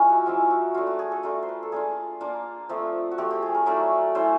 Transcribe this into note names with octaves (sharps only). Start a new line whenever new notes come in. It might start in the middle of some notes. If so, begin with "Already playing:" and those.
Already playing: F3 G#3 C#4 E4 A#4
F#4
F3 G#3 C#4 E4 F4
F#4
A3 D4 F4 F#4
F#4
G#4
A4
A3 D4 F4 A#4
C5
B4
A4
A#3 D4 F4 G#4
A#3 D4 F4
F3 A3 C4
F#4
F3 A3 C4 G4
G4
G#4
A#4
F#3 A3 C#4 E4 D5
F#3 A3 C#4 E4 C5